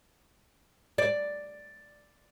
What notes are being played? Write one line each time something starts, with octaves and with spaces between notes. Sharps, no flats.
D5